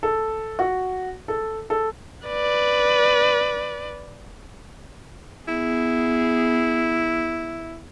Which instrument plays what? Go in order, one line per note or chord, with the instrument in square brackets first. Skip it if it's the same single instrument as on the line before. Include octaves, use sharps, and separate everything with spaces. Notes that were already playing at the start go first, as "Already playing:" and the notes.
[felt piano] A4
F#4
A4
A4
[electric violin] B4 D5
[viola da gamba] B3 G#4 [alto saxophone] E4